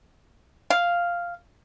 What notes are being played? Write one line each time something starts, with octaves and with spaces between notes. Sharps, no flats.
F5